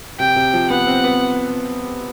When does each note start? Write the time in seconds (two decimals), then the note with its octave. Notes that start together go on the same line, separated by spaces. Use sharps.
0.19 C3 G5
0.36 C3
0.54 F3
0.70 B3 F#5
0.87 C4
1.04 B3